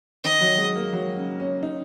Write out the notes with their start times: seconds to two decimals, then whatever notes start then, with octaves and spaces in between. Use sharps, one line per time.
0.24 D#3 D#5
0.41 F#3
0.58 G#3
0.76 A#3
0.93 F#3
1.17 C#3
1.40 C#4
1.63 D#4